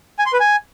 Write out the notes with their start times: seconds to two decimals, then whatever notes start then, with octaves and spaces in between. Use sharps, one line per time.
0.19 G#5
0.26 C6
0.33 B4
0.40 G#5